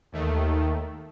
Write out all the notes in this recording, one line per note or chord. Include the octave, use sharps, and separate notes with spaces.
D#2 D#3 A3